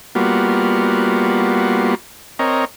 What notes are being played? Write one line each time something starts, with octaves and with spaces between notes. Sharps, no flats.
G3 A#3 B3 F4 F#4
C4 A#4 C#5 D#5